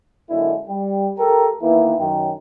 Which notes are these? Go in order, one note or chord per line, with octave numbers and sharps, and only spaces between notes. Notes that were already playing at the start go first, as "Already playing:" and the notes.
F#2 D3 G#3 A#3 D4 E4
G3
A3 G4 A4 A#4
D#3 E3 A#3 B3 E4
F#2 D#3